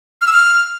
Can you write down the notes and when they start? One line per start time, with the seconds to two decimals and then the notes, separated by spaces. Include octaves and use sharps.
0.21 F6
0.27 E6
0.33 F6